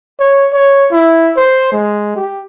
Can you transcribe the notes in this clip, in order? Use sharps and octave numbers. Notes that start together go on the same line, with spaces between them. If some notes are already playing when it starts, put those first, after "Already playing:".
C#5
C#5
E4
C5
G#3
G4